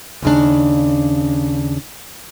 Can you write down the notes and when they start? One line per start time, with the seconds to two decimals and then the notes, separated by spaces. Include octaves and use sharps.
0.22 D#2 C#3 D4